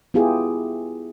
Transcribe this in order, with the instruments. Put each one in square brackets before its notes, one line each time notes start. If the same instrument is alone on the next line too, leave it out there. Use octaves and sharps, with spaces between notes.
[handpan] B3 E4 F4 G4 G#4